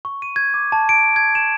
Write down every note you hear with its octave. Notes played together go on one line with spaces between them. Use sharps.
C#6
D#7
G#6
D6
A5
D7
G#6
E7